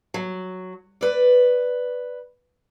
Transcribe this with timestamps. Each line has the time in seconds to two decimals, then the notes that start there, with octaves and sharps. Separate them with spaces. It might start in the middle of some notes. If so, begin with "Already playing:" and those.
0.14 F#3
1.01 B4 D5